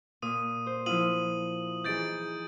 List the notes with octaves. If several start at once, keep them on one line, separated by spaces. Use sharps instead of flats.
A#2 D#6 D#7
C5
F3 E4 F4 D#6 D#7 F#7
E3 D#4 G#4 G6 A6 D7